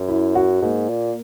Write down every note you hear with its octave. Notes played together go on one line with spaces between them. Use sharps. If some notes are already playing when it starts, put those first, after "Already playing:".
Already playing: F#2
E4
F#4
G#2 A#3
A#2